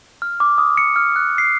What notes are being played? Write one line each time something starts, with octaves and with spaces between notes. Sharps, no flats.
F6
D6
D#6
C#7
F6
F#6
C7